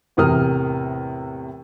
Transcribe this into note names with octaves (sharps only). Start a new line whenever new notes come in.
E2 A2 C3 A#4 D#6 F6